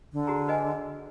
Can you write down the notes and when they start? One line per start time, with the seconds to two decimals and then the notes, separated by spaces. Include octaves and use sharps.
0.13 D3
0.27 F#4 G#4 A#5
0.48 B4 D#5 G#5